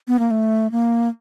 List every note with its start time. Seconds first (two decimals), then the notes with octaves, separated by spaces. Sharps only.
0.08 B3
0.19 A#3
0.31 A3
0.72 A#3